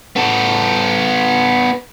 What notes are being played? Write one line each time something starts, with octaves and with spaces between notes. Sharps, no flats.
B3 A4